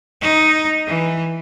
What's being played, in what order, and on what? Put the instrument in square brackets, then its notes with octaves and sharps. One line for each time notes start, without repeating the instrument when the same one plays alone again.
[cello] D#4
E3